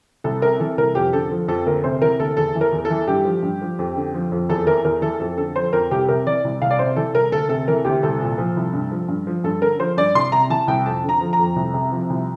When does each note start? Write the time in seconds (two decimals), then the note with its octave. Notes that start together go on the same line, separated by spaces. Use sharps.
0.24 C2 A4
0.42 C3 A#4
0.60 E3 A4
0.77 C2 A#4
0.95 F2 G4
1.13 D3 A4
1.31 F3
1.48 F2 A4
1.66 D2 A#4
1.84 C3 C5
2.02 E3 A#4
2.20 D2 A4
2.37 E2 A4
2.55 E3
2.61 A#4
2.72 E2
2.85 A4
2.90 E3
3.07 G2 G4
3.25 F3
3.43 G2
3.61 F3
3.79 F2
3.96 D3
4.14 F3
4.32 F2
4.49 E2 A4
4.67 E3 A#4
4.85 E2 A#4
5.02 E3 A4
5.20 F2 A4
5.37 D3 A4
5.56 F3 C5
5.73 F2 A#4
5.91 C2 G4
6.09 C3 A#4
6.26 E3 D5
6.44 C2
6.61 C2 F5
6.71 D5
6.79 C3 C5
6.96 E3 A4
7.14 C2 A#4
7.32 D2 A4
7.49 C3 A4
7.68 E3 A#4
7.85 D2 G4
8.03 C2 A4
8.21 A#2
8.38 F3
8.57 C2
8.73 G2
8.91 F3
9.08 G2
9.27 F3
9.44 G2 A4
9.62 D3 A#4
9.79 F3 C5
9.97 G2 D5
10.15 C2 C6
10.32 C3 A#5
10.50 E3 A5
10.68 C2 G5
10.86 F2 A5
11.04 D3 A#5
11.21 F3
11.33 A#5
11.39 F2
11.56 C2
11.74 C3
11.92 F3
12.10 C2